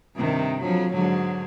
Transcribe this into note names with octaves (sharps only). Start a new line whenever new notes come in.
G2 C3 D#3
F2 F3 F#3
G#2 D3 F#3